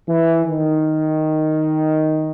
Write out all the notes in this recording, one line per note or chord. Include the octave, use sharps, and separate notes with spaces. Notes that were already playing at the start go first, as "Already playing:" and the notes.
E3
D#3